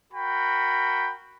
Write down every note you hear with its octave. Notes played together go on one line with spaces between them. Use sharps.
F#4 A#4 G5 B5